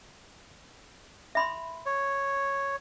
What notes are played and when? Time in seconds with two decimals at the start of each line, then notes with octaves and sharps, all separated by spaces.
1.35 E5 B5 C6
1.86 C#5